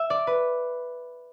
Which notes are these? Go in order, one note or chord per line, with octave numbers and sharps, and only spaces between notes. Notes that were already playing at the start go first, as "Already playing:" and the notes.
Already playing: E5
D5
B4